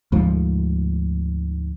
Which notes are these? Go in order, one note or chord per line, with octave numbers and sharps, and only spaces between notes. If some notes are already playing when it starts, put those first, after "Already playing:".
D2 G#2 F3